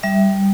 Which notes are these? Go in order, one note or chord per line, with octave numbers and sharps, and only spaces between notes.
G3 E5